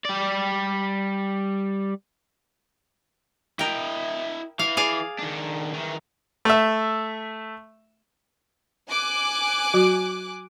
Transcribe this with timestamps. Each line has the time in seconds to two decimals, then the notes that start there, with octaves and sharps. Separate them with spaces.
0.05 G3 D5
3.59 E4 A#4 D#5 G5
4.59 E3 F5
4.77 G#4 D5 F5
5.19 D#3 D4
5.74 D#3 E3
6.45 A3 E5
8.90 G#5 D6 F#6
9.74 F#3 F#4